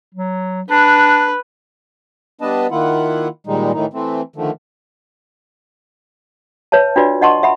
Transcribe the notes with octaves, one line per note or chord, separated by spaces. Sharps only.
F#3
D4 B4
G3 B3 D4 B4 D#5 A5
D#3 A#3 E4 F4 F#5
A#2 D#3 G3 G#3 D#4
A2 D#3 E3 D#4
E3 A3 C4
D3 D#3 F3 A3
B4 C#5 E5 A5
D4 F4 F#4 B4 D5
D4 D#5 F#5 A5 C6 C#6
E5 F#5 B5